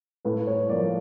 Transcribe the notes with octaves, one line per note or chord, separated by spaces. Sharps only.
A2 B4
C#5
F3 A#3 D5